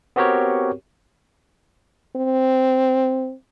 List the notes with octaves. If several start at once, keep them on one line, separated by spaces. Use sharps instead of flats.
B3 C4 F#4 G4 A#4 C#5
C4